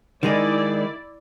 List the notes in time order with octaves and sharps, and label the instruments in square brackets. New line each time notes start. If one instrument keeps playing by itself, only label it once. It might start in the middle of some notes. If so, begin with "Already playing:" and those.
[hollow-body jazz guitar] D#3 G#3 D#4 [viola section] E4 D5